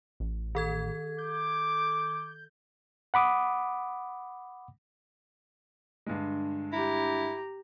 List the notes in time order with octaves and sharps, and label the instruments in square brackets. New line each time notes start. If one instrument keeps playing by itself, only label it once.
[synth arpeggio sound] A1
[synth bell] D#3 A4 G#6
[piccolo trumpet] D6 [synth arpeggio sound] G6
[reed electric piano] F#5 B5 D6 D#6
[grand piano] G2 D3 G#3
[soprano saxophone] E4 [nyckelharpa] G4 A#5